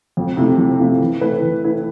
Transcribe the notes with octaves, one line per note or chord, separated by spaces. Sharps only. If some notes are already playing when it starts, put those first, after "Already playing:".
F2
C3 F3 A3 E4
F2
C3 F3 A3 E4
E3
A3 E4 B4
E3
A3 E4 B4